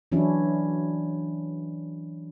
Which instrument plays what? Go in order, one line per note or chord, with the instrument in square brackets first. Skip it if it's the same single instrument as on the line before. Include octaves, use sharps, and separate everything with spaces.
[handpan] E3 F#3 C#4 D4 E4